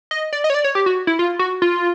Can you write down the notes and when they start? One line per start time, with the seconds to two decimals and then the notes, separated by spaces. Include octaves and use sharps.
0.11 D#5
0.33 D5
0.44 D#5
0.50 C#5
0.54 D5
0.64 C#5
0.75 G4
0.86 F#4
1.07 E4
1.19 F4
1.39 F#4
1.62 F4